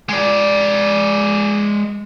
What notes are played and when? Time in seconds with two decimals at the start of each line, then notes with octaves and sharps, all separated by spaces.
0.09 G#3 D5